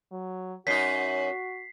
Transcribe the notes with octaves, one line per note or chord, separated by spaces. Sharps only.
F#3
F#2 D#4 F#4 B6 C7